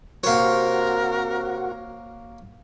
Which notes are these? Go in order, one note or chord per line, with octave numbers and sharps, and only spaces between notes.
C3 A#3 F#4 A#4 C5 C#5